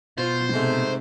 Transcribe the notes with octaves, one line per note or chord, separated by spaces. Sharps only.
B2 F4 C5
G#2 C3 A3